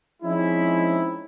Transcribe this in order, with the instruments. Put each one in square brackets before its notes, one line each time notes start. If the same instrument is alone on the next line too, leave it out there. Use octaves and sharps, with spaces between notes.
[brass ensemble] F3 G#3 C4 C#4 D#4 E4